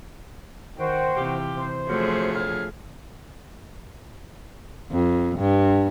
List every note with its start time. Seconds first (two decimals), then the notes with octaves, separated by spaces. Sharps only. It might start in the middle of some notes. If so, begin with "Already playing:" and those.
0.77 D#3 F#4 C5 G5
1.16 C3 E3 F4 G4
1.56 C5
1.88 F#2 A2 F3 F#3 A3 G#4
2.34 D2 C#5 F5
4.91 F2
5.38 G2